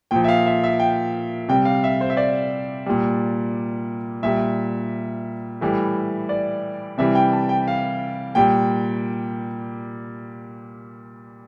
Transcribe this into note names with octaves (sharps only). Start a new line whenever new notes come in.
A#2 F3 G5
E5
F5
E5
E5
G5
C3 G3 G5
F5
E5
C5
E5
D5
A#2 G3
A#2 G3 E5
A2 E3 G3
D5
C3 E3 G3 E5
G5
A5
G5
F5
A#2 G3 G5